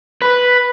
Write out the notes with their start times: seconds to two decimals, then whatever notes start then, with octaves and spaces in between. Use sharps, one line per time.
0.22 B4